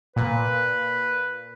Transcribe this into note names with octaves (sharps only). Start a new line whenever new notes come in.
A#2 B4